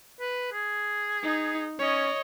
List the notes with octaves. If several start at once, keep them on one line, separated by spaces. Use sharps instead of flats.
B4
G#4
D#4
C#4 C#5 D#5